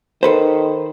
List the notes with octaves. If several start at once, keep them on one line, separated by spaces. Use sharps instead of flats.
D#3 A4 B4 C5